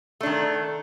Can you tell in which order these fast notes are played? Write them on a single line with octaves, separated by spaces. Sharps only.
A3 D4 D#3